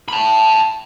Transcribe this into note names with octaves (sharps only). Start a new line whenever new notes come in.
A5 B5